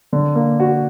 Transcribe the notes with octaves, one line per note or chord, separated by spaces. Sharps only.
D3
A#3
F#4